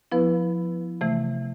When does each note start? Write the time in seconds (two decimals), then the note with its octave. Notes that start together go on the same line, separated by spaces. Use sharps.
0.11 F3 B3 E4 B4
1.01 C3 E3 A3